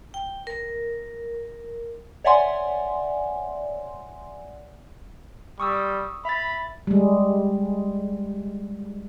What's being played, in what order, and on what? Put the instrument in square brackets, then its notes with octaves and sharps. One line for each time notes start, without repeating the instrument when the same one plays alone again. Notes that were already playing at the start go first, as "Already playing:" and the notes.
[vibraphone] G5
A#4
[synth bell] C#5 D5 E5 F#5 G#5 C6
[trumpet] G3 [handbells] C#6 D#6 E6
[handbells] E5 A6 [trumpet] B5
[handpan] G3 G#3